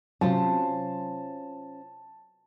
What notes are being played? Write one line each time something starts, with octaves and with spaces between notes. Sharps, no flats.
C3 F#3 C#4 F4 C5 A5